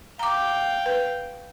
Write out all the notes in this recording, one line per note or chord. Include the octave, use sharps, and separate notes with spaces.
F5 G5 A#5 D6
B4